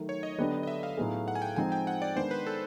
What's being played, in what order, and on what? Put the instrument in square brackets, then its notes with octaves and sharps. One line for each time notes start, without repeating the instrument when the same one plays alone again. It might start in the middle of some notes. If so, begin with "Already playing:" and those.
Already playing: [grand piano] D#3 F#3 A3
[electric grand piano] C#5
D#5
[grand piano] D3 F#3 B3 D4 G4
[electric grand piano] D#5
E5
F5
[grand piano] A2 F#3 B3 D#4 G#4
[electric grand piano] F#5
G#5
G5
[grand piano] F3 G#3 C4 D#4 [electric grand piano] G#5
[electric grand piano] G5
F#5
D5
[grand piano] D#3 G#3 B3 D4 [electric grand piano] C5
[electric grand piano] B4
A4